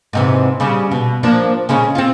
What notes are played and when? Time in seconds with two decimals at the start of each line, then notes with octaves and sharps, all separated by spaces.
0.13 G#2 C3 E3
0.60 C#3 G3
0.91 B2
1.23 F3 A#3 D4
1.69 C#3 G#3 C#4
1.95 C4 F4